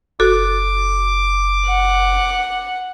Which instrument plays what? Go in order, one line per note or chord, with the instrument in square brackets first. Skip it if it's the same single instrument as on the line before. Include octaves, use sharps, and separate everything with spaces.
[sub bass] F#1 [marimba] F#4 A4 [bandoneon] D6
[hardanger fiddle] F#5